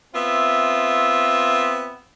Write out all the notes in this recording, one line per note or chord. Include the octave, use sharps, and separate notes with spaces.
B3 C4 F4 E5